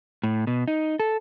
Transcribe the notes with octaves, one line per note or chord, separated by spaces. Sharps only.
A2
B2
D#4
A4